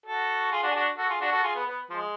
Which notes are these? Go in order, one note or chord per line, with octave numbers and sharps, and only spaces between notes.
F#4 A4
F4 G#4
D4 F#4
G#4
D4 F#4
F#4 A4
F4 G#4
D4 F#4
F#4 A4
F4 G#4
B3
B3
F3 G#3